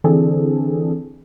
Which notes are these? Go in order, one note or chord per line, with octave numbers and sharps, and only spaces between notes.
D3 E3 C4 D4 G#4 A4